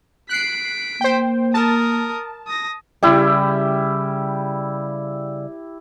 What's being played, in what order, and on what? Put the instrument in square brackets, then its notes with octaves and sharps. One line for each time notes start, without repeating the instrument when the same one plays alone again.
[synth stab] F#6 C7 [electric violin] B6 D7
[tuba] A#3 [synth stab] C5 G5
[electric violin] A#4 D#6 [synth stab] A5
[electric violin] D#6 A#6
[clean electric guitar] C#3 G3 [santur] E4 G4